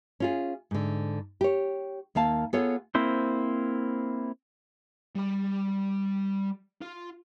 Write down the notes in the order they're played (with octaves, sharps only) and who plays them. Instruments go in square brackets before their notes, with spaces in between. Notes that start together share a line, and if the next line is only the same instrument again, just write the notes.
[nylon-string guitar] C#4 F4 G#4
G#2 D3
G4 C#5
D#2 A#3 F5 A5
B3 F4 G#4 A4 C#5
[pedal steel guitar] A#3 C4 E4 C5
[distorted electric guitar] G3 B5
F4